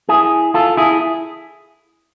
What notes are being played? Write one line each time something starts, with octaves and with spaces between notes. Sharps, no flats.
E4 G#4
F4 A4
E4 G#4